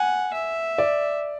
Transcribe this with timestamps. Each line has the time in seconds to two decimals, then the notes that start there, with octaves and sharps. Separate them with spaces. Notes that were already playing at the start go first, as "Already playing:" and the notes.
Already playing: F#5 G#5
0.33 E5
0.78 D5